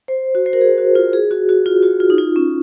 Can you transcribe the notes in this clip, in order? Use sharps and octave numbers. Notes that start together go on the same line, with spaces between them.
C5
F#4
C5
A#4
G#4
F#4
F4
G#4
F#4
F#4
F4
F#4
F4
D#4
F4
C#4